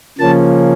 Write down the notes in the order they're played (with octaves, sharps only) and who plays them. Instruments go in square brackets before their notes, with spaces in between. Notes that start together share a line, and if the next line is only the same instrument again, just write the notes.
[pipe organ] C#3 F3 A#3 C#4 A5